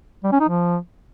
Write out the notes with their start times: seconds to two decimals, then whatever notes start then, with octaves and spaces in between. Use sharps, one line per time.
0.24 G3
0.32 C#4
0.40 D#4
0.49 F3